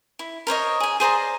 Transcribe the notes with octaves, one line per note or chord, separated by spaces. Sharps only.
E4
A#4 C5 C#5 D#5
G#4 G#5
G#4 C5 D5 A#5